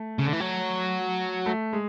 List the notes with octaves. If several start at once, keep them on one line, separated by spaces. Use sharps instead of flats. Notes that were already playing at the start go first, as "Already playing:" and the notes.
Already playing: A3
C#3
D3
E3
F#3
A3
G#3